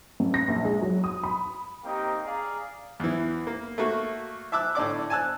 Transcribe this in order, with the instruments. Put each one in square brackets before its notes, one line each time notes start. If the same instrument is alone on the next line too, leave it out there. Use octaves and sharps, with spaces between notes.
[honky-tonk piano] A1
A#6
A#1
G#3
F#3
D#6
B5
[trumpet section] A#3 C4 D#4 G4 D#5 G5
G#4 D5 F5 A#5
[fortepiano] E2 E3
A#3
A3 A#3 F#4
E5 A5 D6 E6 F#6
A2 D3 D5 D6
G#5 A5 E6 F#6